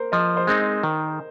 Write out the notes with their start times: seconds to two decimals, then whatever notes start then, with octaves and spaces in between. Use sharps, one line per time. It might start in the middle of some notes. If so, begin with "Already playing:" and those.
Already playing: A#3 A#4 C5
0.12 F3 D#5
0.37 C5
0.47 G#3 C4 D#4
0.60 D#5
0.83 D#3